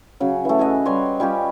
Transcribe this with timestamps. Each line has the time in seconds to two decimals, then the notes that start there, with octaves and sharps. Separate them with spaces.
0.20 C#3 F#3
0.45 E3 A3
0.59 G#4 A4 D#5 F#5
0.85 G3 B4 C#5 C6
1.20 G3 C#4 F4 G4